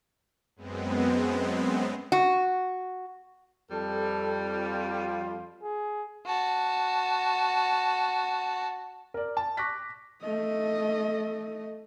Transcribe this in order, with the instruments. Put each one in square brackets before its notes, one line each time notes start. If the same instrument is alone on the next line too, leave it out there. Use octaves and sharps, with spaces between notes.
[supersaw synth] F#2 G#3 B3 C4
[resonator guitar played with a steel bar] F#4
[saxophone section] F2 G3 [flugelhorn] A4
[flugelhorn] F4
G#4
[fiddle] F#4 A5
[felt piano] A#4 D5
A5
C#6 D6 F#6 A#6 B6
[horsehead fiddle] A3 D#5